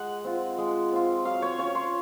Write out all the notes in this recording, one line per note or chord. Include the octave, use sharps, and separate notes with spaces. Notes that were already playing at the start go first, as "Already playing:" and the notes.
Already playing: G#3 F#5
C4 F4
G#3
C4 F4
F#3 F5
C#5
C#4 F4 C#5
C6